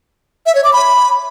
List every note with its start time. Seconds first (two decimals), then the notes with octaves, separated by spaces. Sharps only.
0.46 E5
0.55 C#5
0.64 D6
0.73 B5